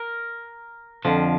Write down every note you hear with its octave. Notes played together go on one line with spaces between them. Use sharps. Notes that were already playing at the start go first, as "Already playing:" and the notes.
Already playing: A#4
F2 D3 F3